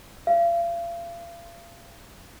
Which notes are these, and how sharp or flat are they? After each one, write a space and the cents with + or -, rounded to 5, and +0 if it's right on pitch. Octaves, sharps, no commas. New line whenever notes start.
F5 -40